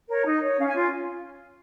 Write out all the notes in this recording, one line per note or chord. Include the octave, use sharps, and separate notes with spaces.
A#4 C#5
D#4
C#5
C#4 F5
G#5
F4